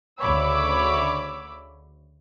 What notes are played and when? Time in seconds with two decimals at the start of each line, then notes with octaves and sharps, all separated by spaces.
0.20 D2 C#3 C#5 B5 D6 E6